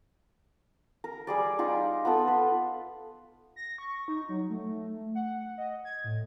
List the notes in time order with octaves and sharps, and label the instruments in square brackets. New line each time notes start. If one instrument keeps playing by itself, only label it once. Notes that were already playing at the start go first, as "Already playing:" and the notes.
[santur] A#4
G3 G#4 D5
D#4 F4 G4
B3 F4 A4
B4 C6
[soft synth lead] A#6
C#6
D#4
F#3
A3
F#5
D#5
G#6
A2